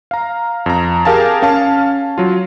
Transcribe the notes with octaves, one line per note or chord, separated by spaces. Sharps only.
F5 A#5
F2 A#5
G4 G#4 A#4 F5 G#5 A5
C#4 F5 A5
F#3 F4